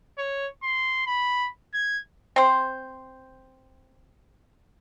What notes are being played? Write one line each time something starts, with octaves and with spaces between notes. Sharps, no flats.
C#5
C6
B5
G#6
C4 C5